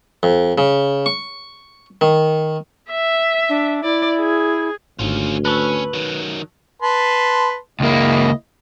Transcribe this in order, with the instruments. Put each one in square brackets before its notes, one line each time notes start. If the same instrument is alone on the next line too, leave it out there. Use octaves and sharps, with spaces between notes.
[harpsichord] F2
C#3
C#6
D#3
[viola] E5
[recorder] D4
[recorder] E4 [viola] D5
[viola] G#4
[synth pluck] G#1 G#2 D#3 [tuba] D2 [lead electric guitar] C#4 F4
[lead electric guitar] C#4 [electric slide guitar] B4 [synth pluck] A5 C#6 E6
[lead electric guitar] D#3 F#3
[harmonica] B4 A5 C6
[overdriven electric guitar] C#2 A#3 [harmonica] G#3 E4 D#5